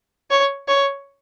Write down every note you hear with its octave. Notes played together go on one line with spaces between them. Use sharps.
C#5
C#5